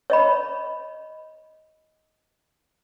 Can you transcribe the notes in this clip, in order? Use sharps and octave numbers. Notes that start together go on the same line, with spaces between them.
C#5 D#5 B5